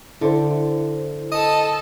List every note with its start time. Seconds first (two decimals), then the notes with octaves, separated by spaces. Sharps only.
0.21 D3 E4 C5
1.32 A4 D#5 A5